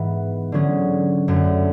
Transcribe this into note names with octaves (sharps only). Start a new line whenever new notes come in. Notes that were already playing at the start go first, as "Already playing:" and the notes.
Already playing: G#2 E3 B3
D3 F#3 C#4 G#4
F#2 D3 A3